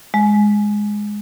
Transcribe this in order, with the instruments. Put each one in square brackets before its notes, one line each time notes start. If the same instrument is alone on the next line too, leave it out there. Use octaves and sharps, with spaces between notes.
[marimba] G#3